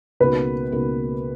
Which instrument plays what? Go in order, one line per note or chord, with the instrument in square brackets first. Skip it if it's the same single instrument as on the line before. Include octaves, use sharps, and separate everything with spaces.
[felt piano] C#2 B2 A#3 D#4 F#4 [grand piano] B4
[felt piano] C#2 B2 A#3 D#4 F#4